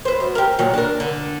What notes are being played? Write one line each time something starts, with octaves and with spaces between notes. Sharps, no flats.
B4 C5
F#2
G4 A#4
A#2 D#3 F#3
D4 A#4
D3